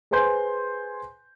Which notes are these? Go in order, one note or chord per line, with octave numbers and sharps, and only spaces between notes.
G#4 B4 C5 G#5 C6 G6